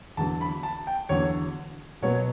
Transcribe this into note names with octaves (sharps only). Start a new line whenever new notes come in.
E2 D3 F#3 A5
B5
A5
G5
E2 D3 F#3 C#5
B2 F#3 B3 C#5